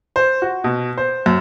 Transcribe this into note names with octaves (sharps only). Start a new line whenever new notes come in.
C5
F#4
B2
C5
F#2